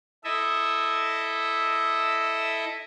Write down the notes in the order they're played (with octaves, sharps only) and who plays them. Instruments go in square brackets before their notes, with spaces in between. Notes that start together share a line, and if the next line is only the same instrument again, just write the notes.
[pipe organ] E4 A4 D#5 E5